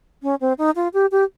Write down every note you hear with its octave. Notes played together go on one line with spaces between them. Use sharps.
C#4
C4
D#4
F4
G4
G4